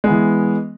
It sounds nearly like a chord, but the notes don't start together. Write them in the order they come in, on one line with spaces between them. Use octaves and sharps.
G#3 B3 E3